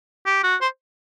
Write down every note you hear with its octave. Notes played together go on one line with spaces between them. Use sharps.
G4
F#4
C5